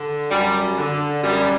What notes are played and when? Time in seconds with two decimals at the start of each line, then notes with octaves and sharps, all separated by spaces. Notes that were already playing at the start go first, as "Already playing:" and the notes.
Already playing: D3
0.31 F#2 G3
0.78 D3
1.23 F#2 G3